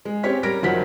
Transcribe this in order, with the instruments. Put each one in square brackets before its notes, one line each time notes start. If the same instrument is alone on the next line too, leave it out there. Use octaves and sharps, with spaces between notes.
[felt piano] G#3
C4 C#4 G4 C#5 B6
G3 A#4 A#6 D7
F#1 D#3 F3 F#3 F#5 B6